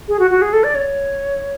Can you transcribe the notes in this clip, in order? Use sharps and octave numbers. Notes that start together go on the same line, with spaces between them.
G#4
F#4
F#4
G#4
A4
D5
C#5